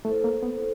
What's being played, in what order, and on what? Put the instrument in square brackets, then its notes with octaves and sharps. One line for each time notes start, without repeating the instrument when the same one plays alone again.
[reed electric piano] A3 [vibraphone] E4 A4 C5
[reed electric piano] A#3
B3